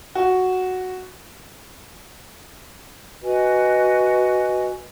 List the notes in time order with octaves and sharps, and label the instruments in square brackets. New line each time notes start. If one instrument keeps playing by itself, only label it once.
[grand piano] F#4
[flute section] F#4 B4 D#5 G#5